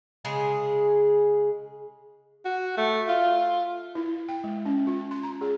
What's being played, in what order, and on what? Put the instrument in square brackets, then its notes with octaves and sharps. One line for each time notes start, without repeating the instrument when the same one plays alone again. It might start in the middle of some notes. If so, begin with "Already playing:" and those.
[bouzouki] C#3 G#3 G#4
[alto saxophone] F#4
A3
F4
[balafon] E4
G5
G#3
C#4
F4
C6
A#5
G#4